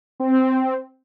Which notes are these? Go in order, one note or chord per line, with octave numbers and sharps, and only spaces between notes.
C4